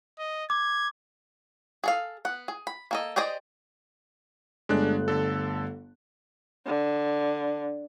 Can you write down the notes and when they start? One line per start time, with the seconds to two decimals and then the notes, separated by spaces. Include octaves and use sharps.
0.19 D#5
0.50 D6 G#6
1.84 G#4 A4 F5
2.25 B3 F#5
2.48 G#4
2.67 B5
2.91 A#3 A4 D#5
3.16 G4 G#4 C5 D5 D#5
4.69 G1 G#3 A3 D4 F#6
5.08 D3 A4
6.66 D3